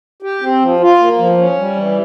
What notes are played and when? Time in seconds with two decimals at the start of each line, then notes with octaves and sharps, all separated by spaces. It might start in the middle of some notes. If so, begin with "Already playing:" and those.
0.22 G4
0.41 C4
0.60 F3
0.80 F4
0.99 A#3
1.18 F3
1.37 C#4
1.58 G3
1.76 E3